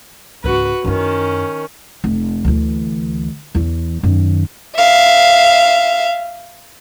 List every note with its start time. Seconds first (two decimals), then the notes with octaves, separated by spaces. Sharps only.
0.44 C#2 G#2 F#4 B4
0.84 F#2 D#3 C#4 E4
2.04 F1
2.44 D2 E3
3.55 E2 E3
4.03 F#2 D#3
4.75 E5 F5